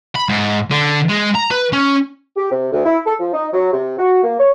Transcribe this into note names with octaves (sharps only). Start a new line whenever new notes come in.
B5
G#2
D3
G#3
A#5
B4
C#4
G4
C3
D2
E4
A4
F3
D#4
F#3
C3
F#4
A#3
C#5